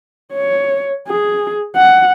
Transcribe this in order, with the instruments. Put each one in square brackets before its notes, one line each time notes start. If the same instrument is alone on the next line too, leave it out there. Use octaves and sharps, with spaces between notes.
[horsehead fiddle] C#5
G#4
F#5